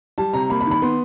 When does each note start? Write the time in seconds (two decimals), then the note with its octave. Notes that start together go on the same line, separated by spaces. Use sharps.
0.18 G3 A5
0.33 C3 A#5
0.50 A#3 B5
0.61 B5
0.66 D#3
0.71 B5
0.82 B3 C6